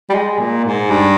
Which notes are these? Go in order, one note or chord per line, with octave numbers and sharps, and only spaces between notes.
G3
G#3
A#2
G#2
G2